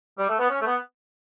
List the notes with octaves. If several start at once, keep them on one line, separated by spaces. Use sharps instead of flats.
G3
A3
B3
C#4
A3
B3